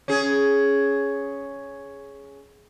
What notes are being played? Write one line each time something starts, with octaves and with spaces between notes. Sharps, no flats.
C#4 G#4